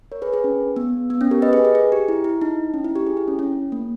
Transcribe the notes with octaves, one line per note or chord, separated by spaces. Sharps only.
A#4 C#5
G#4 B4
G#4 B4
C#4
B3
B3
C#4
G4 A#4
B4 D#5
G#4 B4
G#4
G#4
G4
E4
E4
D#4
C#4
E4
G4
G#4
E4
C#4
C#4
A#3